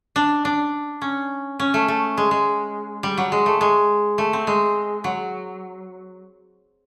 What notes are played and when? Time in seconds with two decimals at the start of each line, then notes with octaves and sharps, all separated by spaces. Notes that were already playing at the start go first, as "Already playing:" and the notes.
0.16 D4
0.45 D4
1.02 C#4
1.59 C#4
1.74 A3
1.88 A3
2.17 G#3
2.31 G#3
3.03 G3
3.17 F#3
3.32 G#3
3.46 A3
3.61 G#3
4.18 A3
4.33 C4
4.47 G#3
5.04 F#3